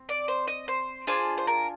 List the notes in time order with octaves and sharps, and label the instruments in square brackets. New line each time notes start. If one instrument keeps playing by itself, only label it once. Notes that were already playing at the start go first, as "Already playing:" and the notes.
Already playing: [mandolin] C4
D5
C5
D#5
C5
D4 F4 G#4 C5
C5
A#4